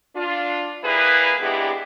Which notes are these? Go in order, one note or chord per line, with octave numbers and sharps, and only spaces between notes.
D4 F4
G3 A#3 E4 G#4 B4
F2 G#3 B3 D4 E4 G4